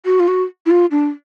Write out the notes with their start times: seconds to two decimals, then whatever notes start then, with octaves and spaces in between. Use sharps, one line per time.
0.05 F#4
0.20 F4
0.28 F#4
0.66 E4
0.71 F4
0.91 D4